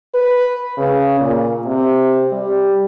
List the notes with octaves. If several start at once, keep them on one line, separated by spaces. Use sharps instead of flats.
B4
C#3
A#2
C3
G3